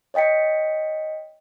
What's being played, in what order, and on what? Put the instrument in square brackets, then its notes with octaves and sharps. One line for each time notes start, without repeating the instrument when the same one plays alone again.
[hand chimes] C#5 D#5 G5 B6 C#7